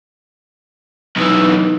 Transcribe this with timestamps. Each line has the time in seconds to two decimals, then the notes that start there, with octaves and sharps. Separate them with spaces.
1.16 B1 E3 D#4